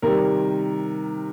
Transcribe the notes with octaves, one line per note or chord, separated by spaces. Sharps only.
C3 D#3 G3 A#4